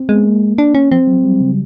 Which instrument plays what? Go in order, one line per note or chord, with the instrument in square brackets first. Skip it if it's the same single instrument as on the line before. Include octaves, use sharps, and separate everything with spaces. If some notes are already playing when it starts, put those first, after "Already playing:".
Already playing: [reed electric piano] C4
[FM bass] G#3 [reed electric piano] B3
[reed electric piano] A#3
[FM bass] D4
C#4
[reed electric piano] F3 [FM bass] C4
[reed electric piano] F#3
G3
C#3